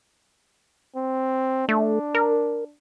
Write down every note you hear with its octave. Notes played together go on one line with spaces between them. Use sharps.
C4
A3 D4
A#4